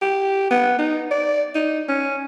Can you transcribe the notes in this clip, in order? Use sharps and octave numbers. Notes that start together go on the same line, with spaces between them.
G4
B3
D#4
D5
D#4
C#4